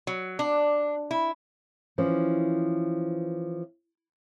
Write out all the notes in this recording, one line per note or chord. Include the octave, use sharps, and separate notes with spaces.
F#3
D4
E4
E3 F3 C#4